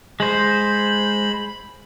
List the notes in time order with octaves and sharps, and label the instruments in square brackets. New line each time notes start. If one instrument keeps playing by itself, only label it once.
[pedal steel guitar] G#3 C5 [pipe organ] B5